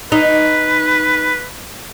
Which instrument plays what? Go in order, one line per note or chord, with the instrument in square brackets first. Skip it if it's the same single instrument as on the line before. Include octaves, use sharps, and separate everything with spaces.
[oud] D#4 [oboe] B4